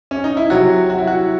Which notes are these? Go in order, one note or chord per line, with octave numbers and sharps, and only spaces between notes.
C#4
D#4
E4
C3 F#3 F#4
F#4
E4
F#4